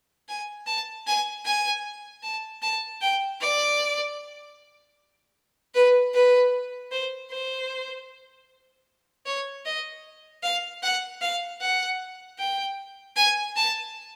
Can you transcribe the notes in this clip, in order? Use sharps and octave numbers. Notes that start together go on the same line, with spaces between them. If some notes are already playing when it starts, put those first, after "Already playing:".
G#5
A5
G#5
G#5
A5
A5
G5
D5
B4
B4
C5
C5
C#5
D#5
F5
F#5
F5
F#5
G5
G#5
A5